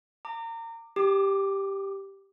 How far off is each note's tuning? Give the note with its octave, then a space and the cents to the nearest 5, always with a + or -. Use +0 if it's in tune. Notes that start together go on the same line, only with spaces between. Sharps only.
A#5 -30 D6 +15
G4 +0 D6 +35